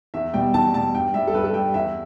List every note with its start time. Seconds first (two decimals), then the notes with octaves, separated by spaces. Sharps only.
0.14 E2 E5
0.34 B2 G3 G5
0.54 E2 A5
0.74 B2 G3 A5
0.94 G2 G5
1.14 G3 E5
1.27 A4
1.34 G2 B4
1.44 A4
1.54 G3 G5
1.74 E2 E5